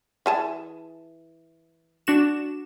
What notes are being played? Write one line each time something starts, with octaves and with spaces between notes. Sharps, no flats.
E3 G#4 A5
D4 F#4 E7